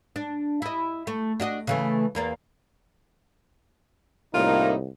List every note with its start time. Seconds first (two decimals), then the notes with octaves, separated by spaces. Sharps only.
0.16 D4
0.62 E4 D#5
1.07 A3
1.40 D4 F#4 D#5
1.67 C#3 E3 A3
2.15 E2 A#3 D5
4.34 C2 A2 A#3 D#4 F4